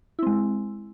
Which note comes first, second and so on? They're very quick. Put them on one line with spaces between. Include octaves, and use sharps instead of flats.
E4 C4 G#3